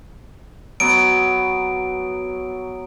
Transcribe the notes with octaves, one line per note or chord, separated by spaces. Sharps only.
F#3 B3 D7